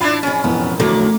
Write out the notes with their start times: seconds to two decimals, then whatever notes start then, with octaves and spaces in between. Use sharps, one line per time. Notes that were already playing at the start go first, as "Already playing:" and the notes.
0.01 A1 D4 E4 F4 B5 A6
0.23 F2 C#4 G#4
0.44 E1 A1 F2 B3
0.80 D3 F#3 A3 A#3 E4